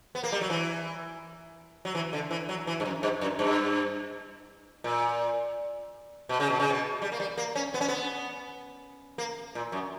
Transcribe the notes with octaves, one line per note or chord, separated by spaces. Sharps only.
B3
A#3
G3
F#3
E3
F#3
E3
D3
E3
F#3
E3
G2
F#2
G2
F#2
G2
A#2
B2
C#3
B2
C#3
B2
G3
A#3
G3
A#3
C#4
B3
C#4
B3
A#3
A#2
F#2